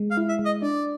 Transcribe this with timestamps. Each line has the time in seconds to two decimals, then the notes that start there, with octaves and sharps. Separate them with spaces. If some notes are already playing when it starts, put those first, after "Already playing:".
Already playing: G#3
0.11 F5
0.17 E4
0.29 E5
0.39 G#3
0.45 D#5
0.62 D4 D5